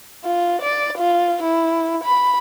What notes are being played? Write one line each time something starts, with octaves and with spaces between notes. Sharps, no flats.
F4
D5
F4
E4
B5